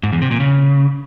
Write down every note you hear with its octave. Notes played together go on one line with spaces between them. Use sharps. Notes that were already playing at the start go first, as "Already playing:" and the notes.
G#2
E2
C3
A#2
C#3